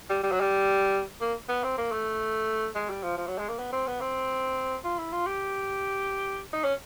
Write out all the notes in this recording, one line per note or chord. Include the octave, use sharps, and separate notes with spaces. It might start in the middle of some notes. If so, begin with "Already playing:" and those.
G3
G3
F#3
G3
A#3
B3
C4
A#3
A3
G#3
G3
F3
F3
F#3
G#3
A#3
B3
C4
B3
C4
F4
E4
F4
G4
D#4
C#4